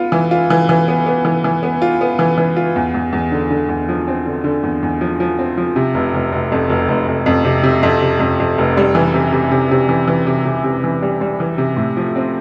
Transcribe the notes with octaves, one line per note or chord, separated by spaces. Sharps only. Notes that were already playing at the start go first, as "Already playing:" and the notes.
Already playing: B3 F4
E3
F4
E3
E3
B3
B3
E3
E3
B3
F4
B3
E3
E3
F4
E2
E2
E2
D3
D3
E2
F3
C4
D3
D3
E2
E2
F3
F3
C4
F3
C3
F1
F1
F1
F2
F1
F1
F1
F2
C3
C3
F2
C3
F2
F2
F1
G3
E3
C3
C3
C3
C3
E3
E3
C3
C3
C3
E3
G3
G3
E3
C3
A2
F3
C4